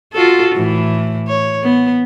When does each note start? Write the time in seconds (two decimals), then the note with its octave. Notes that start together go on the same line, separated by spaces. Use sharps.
0.13 F4 F#4 A4
0.55 A2 E3
1.28 C#5
1.63 B3